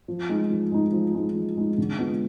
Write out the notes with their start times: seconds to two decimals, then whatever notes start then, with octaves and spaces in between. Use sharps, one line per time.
0.08 F3
0.29 G#3 D#4
0.50 F3
0.72 G#3 D#4
0.92 F3
1.14 G#3 D#4
1.35 F3
1.57 G#3 D#4
1.78 D3
1.99 G#3 B3 F4